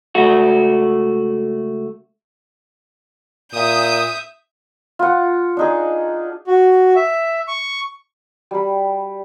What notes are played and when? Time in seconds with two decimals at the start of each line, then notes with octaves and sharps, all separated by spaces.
0.15 C#2 A3 F#4
3.53 A#2 E5 D#6 G6
4.99 F4 F#5
5.57 D4 D#4 G#4
6.47 F#4
6.96 E5
7.48 C#6
8.51 G3 B5